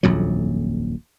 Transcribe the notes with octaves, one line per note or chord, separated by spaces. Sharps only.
D#1 A#1 F2 F#3